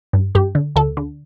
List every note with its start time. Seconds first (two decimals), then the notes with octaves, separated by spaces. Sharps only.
0.13 G2
0.35 G2 G4
0.55 D3
0.76 D2 A4
0.97 D3